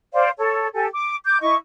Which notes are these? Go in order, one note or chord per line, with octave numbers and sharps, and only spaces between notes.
C5 D5 F5
A4 C#5
G4 A4 G#5
D6
D6 G6
E4 D#5 C#6